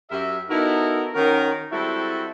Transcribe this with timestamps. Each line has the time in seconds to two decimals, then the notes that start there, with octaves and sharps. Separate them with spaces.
0.11 F#2 G4 A#4 E5
0.49 B3 D#4 E4 F#4 A4 A#4
1.14 D#3 C#4 F#4 A#4
1.71 G3 G#3 C4 E4 F#4 A4